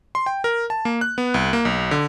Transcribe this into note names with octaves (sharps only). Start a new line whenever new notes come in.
C6
G5
A#4
A5
A#3
F#6
B3
C2
A#3
B1
D3